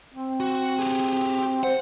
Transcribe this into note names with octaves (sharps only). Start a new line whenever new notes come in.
C4
F#4
G4 G#4
C5 F#5